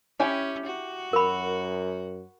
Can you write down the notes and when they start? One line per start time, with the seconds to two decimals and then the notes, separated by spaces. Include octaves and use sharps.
0.20 C#4 E4 G4 G#5
0.66 F#4
1.13 F#2 A#4 B5